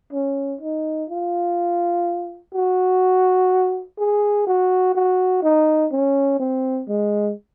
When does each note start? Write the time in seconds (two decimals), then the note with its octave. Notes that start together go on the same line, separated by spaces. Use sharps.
0.12 C#4
0.61 D#4
1.10 F4
2.54 F#4
3.98 G#4
4.47 F#4
4.95 F#4
5.42 D#4
5.91 C#4
6.39 C4
6.88 G#3